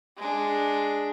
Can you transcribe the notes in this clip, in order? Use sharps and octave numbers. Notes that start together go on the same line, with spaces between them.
G#3 D4